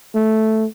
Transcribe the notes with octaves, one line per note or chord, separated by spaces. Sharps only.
A3